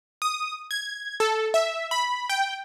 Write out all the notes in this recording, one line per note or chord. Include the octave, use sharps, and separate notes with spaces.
D#6
G#6
A4
E5
B5
G5